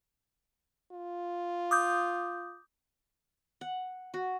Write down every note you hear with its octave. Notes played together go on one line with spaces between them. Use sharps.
F4
D6 D#6 G6
F#5
F#4